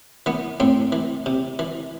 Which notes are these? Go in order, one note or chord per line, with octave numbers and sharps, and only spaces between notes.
E3 B3
A2 C4
E3
C3
E3